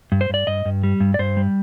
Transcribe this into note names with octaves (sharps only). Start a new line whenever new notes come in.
G2
C5
G2 D5
G2 D#5
G2
G3
G2
D5
G2 C5
G3